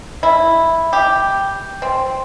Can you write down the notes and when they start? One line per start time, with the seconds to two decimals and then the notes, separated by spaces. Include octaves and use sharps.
0.23 E4
0.93 G4
1.82 C4